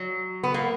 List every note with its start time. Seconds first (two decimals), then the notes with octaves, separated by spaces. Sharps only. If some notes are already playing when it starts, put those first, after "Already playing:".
Already playing: F#3
0.43 B3
0.54 A#3